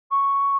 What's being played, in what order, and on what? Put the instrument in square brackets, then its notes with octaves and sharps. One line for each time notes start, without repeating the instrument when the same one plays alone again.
[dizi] C#6